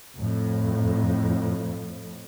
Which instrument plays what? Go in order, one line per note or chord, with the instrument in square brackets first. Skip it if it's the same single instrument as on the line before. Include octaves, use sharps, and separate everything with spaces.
[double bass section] F2 A2